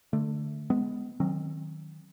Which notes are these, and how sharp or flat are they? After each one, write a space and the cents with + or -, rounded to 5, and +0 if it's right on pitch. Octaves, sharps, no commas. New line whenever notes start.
D3 +15 A3 +0
G#3 +10 B3 +15
D#3 +0 F#3 +0 C4 +40